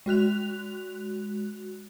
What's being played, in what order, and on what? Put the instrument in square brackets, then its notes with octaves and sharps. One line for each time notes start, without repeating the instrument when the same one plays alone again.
[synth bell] G#3 F#4 F#6 F7